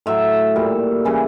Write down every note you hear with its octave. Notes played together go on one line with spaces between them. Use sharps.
A2 F#3 E5
A#2 G3
C#3 E3 G3